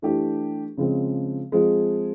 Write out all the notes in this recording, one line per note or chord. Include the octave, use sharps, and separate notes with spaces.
E3 A3 D4 G4
C#3 F3 G#3 C4
F3 G#3 C4 F4 G#4